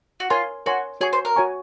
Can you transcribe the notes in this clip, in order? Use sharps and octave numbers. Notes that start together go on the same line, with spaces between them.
F#4
F4 A#4 C#5 G#5 C6
F#4 A#4 C#5 G#5 C6
F#4 G#4 C#5 G#5 C#6
C5
A#4
F#4 C#5 G#5 C#6